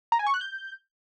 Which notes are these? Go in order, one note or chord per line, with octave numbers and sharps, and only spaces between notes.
A#5
G#5
C#6
F#6
G6